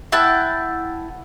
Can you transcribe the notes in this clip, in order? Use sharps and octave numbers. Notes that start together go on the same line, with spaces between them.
E4 F#5 G5 A5